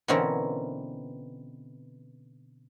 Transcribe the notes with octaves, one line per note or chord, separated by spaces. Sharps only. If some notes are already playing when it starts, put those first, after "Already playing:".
B2 D3 E3 C4 C#4 A#4